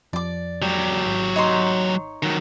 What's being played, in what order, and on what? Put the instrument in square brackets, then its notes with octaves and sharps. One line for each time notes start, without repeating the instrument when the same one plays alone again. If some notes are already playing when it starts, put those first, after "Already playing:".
[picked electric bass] F2 F3 [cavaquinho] D5 D6
[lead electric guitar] F#3 G4
[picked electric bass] G#1
[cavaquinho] D#4 C#5 C6
[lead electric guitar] D#3 F#3